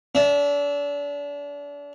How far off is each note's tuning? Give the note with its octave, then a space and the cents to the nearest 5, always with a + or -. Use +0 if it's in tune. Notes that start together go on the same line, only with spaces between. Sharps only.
D4 -35 E5 +0